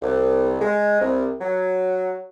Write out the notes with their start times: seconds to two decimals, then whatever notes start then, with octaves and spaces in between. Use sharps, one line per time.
0.02 C2
0.60 G#3
1.00 C2
1.41 F#3